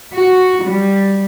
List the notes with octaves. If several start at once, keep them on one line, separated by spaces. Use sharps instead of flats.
F#4
G3